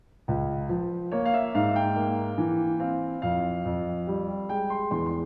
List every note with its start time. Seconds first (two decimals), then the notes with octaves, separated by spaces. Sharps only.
0.28 C#2
0.69 F3
1.12 A#3 C#5
1.25 F5
1.34 E5
1.55 G#2 F5
1.76 G5
1.96 A#3
2.38 E3
2.80 C4 F5
3.22 F2 F5
3.65 F2
4.07 G3
4.49 G#3 G5
4.70 C6
4.91 E2 C6
5.06 C6